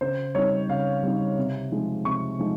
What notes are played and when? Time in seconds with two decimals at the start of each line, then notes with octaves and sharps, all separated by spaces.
0.01 C#3 C5
0.35 G3 C4 D#4 C#5
0.69 C#3 F5
1.03 G3 C4 D#4
1.38 C3
1.71 F3 G#3 D#4
2.05 C3 C#6
2.39 F3 G#3 D#4